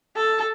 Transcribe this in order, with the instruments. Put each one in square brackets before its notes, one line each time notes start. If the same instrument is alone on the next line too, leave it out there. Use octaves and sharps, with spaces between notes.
[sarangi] A4